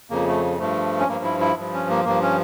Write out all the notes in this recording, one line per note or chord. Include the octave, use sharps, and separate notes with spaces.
F2 C#3 F3 A#3
A3
G2 F3 A3
C#4
G2 F3 A#3
E4
E4
G2 F3
C#4
A#3
G2 F3 A#3
C#4